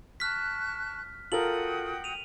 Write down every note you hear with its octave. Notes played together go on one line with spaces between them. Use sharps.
A5 C#6 F6 F#6 B6
F4 F#4 A4 A#4 G5 D#6 F#7
D#7 F7